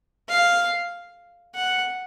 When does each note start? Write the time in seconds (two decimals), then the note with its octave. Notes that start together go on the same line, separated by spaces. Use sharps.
0.29 F5
1.55 F#5